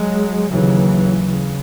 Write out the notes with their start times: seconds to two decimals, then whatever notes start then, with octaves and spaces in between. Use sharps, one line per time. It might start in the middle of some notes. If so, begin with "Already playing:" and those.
Already playing: F#3 G#3
0.49 D#2 C#3 E3 F#3
1.25 C#3